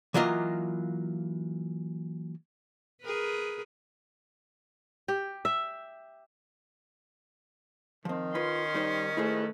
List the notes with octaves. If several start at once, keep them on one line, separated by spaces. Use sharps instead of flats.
E3 F#3 A#3 F4 D#5
G#4 A#4 B4
G4
E5
D#3 F3 C4
C#4 F4 B4 B5 C6
G3 D#4 C5
A3 E4 G#4 B4 C5